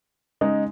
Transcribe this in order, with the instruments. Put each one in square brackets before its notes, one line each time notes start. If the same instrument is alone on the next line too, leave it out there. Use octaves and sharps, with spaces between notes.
[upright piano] C#3 G#3 D#4